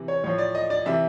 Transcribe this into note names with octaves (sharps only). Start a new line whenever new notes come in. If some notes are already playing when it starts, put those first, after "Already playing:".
Already playing: C3 E3
C#5
A2 F3 C#5
D5
D#5
D5
C3 E3 E5